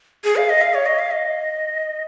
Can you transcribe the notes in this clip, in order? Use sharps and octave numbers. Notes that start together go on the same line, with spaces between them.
G#4
F5
D#5
F5
C#5
D#5
F5
D#5